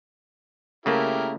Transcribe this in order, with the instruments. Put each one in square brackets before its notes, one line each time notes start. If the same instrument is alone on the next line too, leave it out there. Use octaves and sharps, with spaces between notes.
[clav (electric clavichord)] C#3 A3 A#3 [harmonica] E4 G4 A#4